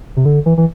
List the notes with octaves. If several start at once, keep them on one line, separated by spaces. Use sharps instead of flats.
C3
D3
E3
E3